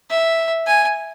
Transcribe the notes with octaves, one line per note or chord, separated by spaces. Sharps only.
E5
G#5